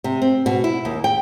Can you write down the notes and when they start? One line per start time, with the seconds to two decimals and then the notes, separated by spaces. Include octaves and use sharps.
0.04 C3
0.22 C4
0.46 B2
0.64 E4
0.85 D#2
1.04 G5